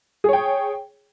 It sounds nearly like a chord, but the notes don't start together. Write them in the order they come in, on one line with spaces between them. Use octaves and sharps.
G#4 C#5 G5